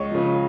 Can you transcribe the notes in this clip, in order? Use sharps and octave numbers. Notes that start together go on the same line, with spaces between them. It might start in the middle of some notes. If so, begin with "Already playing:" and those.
Already playing: C#2 C#5 D#5
C#3 F3